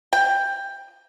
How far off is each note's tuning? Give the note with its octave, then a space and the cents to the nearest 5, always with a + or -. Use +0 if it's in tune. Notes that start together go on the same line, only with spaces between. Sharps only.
G5 +10